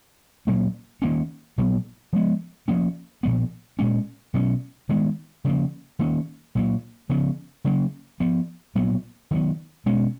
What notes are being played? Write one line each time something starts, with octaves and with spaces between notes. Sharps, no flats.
A#2 F#3 A#3 C#4
D#3 A#3 C#4
A#2 F#3 B3
F3 G#3 B3
F3 A#3 C#4
A#2 F3 B3
A#2 G#3 C#4
B2 F#3 C#4
D#3 G#3 B3
C#3 F3 A#3
D#3 A#3 C#4
A#2 F#3 A#3
C#3 F3 B3
C#3 F#3 A#3
F3 B3
A#2 F#3 B3
D#3 F#3 B3
B2 G#3 C#4